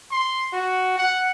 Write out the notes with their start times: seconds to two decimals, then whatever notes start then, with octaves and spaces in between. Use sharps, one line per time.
0.11 C6
0.53 F#4
0.98 F#5